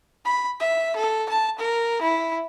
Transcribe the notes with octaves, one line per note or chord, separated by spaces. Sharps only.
B5
E5
A4
A5
A#4
E4